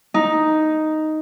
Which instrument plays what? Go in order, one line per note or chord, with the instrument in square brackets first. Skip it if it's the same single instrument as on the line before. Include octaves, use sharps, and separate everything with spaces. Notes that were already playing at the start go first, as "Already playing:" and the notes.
[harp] D#4